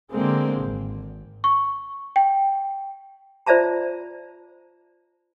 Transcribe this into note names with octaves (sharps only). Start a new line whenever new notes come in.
D3 G#3 A#3 C4
G#1
C#6
G5
F4 C5 D5 E5 A5 A#5